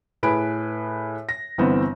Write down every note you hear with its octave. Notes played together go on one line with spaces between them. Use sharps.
A2 G#4 B4 G#5 B5 D7
A#6
G1 E3 B3 C4